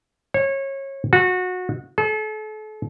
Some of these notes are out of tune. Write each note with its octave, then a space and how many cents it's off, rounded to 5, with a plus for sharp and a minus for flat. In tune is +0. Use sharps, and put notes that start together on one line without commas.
C#5 -25
F#4 -20
A4 -40